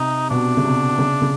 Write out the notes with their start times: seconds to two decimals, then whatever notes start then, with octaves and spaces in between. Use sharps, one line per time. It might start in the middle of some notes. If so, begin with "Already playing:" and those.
Already playing: C3 D#4
0.30 B2 D4
0.57 C#3
0.64 C3
0.99 C#3
1.22 C#3